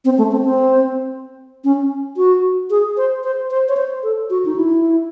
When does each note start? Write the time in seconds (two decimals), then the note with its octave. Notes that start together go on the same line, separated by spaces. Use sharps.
0.05 C4
0.18 A3
0.31 C4
0.45 C4
1.64 C#4
2.17 F#4
2.70 G#4
2.97 C5
3.24 C5
3.50 C5
3.69 C#5
3.77 C5
4.03 A4
4.30 F#4
4.45 D#4
4.56 E4